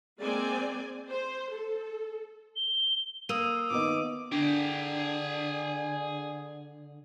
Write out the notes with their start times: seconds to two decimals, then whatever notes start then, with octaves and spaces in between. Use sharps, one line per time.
0.20 G#3 A#3 C4 D5 G#5
1.10 C5
1.55 A4
2.56 G7
3.29 A#3 D#6 E6 D#7
3.70 D#3 B3 D#4 D6
4.32 D3 D4 G#4 G5